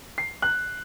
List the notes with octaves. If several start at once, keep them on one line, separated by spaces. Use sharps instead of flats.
C7
F#6